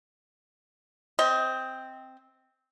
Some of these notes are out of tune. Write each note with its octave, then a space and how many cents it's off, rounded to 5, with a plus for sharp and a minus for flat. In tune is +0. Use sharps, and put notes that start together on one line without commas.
C4 +0 D#5 +30